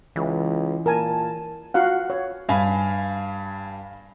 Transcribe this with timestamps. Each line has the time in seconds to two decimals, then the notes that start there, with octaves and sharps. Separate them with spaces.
0.16 C#2 E3
0.86 A#2 A#4 G#5 A5
1.74 F4 F#4 F5 F#5
2.10 C#5
2.49 G2 F5 G#5 B5